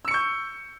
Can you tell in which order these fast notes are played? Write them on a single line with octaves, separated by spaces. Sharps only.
E6 C#7 C#6 G6